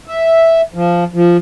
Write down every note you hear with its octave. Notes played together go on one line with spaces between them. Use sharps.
E5
F3
F3